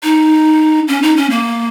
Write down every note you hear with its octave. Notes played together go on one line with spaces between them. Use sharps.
D#4
C#4
D#4
C#4
A#3